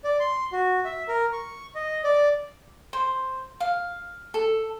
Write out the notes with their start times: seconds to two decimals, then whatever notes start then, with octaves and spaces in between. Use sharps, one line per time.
0.04 D5
0.20 C6
0.52 F#4
0.85 E5
1.08 A#4
1.33 C#6
1.75 D#5
2.04 D5
2.93 C5
3.60 F5
4.34 A4